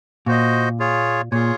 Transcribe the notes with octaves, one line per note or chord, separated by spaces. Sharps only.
A#2 F#4 C5 D#5
F4 G#4 C#5
A#2 F4 G#4 C#5